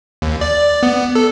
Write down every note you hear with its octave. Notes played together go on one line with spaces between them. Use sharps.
D#2
D5
B3
A4